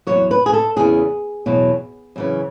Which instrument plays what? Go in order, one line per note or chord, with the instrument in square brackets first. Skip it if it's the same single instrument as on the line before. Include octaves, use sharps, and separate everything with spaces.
[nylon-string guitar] E2 B2 F#3 C#5
B4
G#4
A4
E2 C#3 E3 G#4
E2 B2 F#3
F#2 C#3 E3